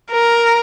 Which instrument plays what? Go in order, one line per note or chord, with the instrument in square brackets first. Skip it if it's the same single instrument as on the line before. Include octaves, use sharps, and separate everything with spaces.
[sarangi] A#4